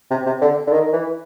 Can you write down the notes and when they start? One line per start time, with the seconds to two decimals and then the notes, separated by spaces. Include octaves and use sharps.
0.10 C3
0.26 C3
0.41 D3
0.67 D3
0.72 D#3
0.93 E3